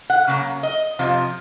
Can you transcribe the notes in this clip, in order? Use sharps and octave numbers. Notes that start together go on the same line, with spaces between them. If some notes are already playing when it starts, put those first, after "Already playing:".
F#5
C#3 F#3 A#3
D#5
F2 C3 F3